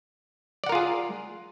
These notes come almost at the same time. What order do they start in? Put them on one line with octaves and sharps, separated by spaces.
D5 F#5 A#4 F4 G#4